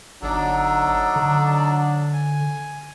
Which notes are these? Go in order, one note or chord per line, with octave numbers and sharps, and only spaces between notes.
G1 F#3 D4 D#4 A4
D3
G#5